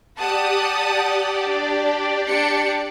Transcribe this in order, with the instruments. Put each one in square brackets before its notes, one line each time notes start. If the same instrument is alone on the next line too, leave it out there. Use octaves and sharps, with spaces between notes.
[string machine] G4 D5 [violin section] F#5 A5 D#6
[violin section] D4
D4 G5 C#7